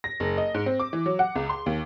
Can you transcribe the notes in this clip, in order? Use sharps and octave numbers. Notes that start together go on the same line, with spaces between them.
A#6
F#1
D#5
G#2
C4
D6
E3
F#3
F#5
C#2
C6
D#2